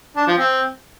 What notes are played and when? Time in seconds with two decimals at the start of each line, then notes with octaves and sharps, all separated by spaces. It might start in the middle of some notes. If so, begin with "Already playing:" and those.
0.17 D4
0.27 F3
0.38 C4